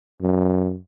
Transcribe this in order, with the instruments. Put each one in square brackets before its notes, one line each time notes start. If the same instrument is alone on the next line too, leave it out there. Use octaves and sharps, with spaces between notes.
[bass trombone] F#2